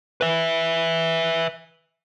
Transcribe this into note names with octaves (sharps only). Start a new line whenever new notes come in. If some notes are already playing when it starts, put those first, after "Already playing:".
B4 E5